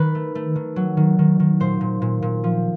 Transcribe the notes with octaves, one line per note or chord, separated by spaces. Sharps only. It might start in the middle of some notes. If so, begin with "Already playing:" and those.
Already playing: D#3 B4
A3
A3
D#3
F#3
D#3
D#3
D#3
A#2 C5
A#2
A#2
A#2
F3